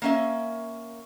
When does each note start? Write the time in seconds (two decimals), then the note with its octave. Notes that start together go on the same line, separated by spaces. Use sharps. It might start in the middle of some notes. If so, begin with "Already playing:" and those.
0.02 A#3 C#4 E5